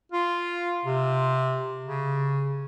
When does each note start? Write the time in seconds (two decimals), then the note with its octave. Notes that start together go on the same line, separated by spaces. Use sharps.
0.12 F4
0.85 C3
1.85 C#3